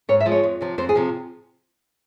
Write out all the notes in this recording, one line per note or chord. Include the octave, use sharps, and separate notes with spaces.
G#2 C#5
E5
F3 G#3
C#5
F2
C3 F3
F2 C5
G#4
C3 F3